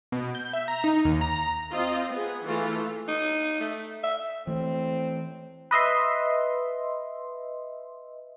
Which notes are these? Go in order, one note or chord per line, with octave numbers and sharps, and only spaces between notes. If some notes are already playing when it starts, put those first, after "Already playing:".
B2
G6
E5
A#5
D#4
D#2
A#5
C4 F4 D#5
B3 G#4
E3 A3 F4
D#4
A3
E5
E3 A3 C4
B4 D#5 E5 C6